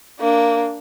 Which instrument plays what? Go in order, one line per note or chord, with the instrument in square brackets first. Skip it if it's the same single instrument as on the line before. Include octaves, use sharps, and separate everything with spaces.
[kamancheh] A#3 D4